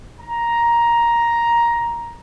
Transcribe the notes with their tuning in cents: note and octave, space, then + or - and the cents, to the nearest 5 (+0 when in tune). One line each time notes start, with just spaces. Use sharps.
A#5 +10